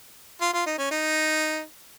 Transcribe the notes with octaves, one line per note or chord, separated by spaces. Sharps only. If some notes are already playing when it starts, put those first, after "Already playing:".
F4
F4
D#4
C#4
D#4